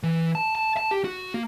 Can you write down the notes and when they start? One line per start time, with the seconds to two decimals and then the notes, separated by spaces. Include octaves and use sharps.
0.03 E3
0.35 A5
0.55 A5
0.77 A5
0.91 G4
1.04 F#4
1.34 A#3